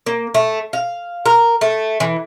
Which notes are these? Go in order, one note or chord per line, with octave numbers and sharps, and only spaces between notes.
A#3
A3
F5
A#4
A3
E3